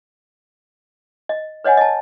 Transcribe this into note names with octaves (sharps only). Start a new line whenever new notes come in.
D#5
B4 C#5 D#5 F#5 G#5
D#5 A5